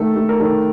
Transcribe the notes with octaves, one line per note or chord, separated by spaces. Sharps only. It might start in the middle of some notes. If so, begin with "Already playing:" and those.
Already playing: D#3 A3 A4
A3
A#4
D#3 A4